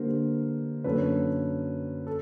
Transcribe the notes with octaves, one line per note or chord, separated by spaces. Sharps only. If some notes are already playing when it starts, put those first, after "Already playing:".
Already playing: D3 G3 A#3 D4 A#4 C5
F#2 D3 F#3 A#3 C#4 A4 B4
A4